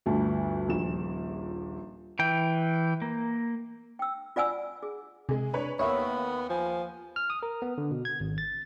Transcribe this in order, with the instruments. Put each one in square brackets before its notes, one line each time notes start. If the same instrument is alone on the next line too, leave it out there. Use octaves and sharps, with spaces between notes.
[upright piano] G1 D2 A5
D#1 A#1 E7
[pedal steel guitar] E3 G5
A#3
[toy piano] G5 E6
F4 D5 F#5 G#5 E6
G#4
[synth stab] C3 [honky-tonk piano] G#3 G#4
[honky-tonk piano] D4 B4 C#5
[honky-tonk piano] D#2 A#3 [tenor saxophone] B3 [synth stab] C#5 E5 [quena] B5
[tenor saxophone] F3 [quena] G#5
[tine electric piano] F6
D#6
A#4
B3
D3
B2
G#6
G#1
A6